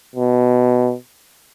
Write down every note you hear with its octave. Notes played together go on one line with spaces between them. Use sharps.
B2